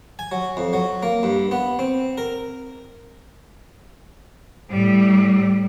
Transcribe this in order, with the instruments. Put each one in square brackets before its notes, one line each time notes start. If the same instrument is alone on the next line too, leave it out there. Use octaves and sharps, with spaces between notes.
[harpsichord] G#5
F#3
F2
F#3
A#3
G2
B3
C4
A#4
[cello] A2 G3